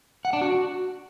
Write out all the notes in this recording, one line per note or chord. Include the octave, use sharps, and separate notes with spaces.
F#5
D4
F#4